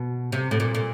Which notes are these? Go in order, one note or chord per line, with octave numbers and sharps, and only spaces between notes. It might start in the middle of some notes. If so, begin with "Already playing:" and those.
Already playing: B2
C3
A2
A#2
A#2